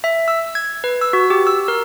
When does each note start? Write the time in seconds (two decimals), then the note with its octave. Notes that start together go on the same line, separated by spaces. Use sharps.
0.04 E5
0.28 E6
0.55 G#6
0.84 B4
1.01 E6
1.13 F#4
1.30 G4
1.47 E6
1.68 A#4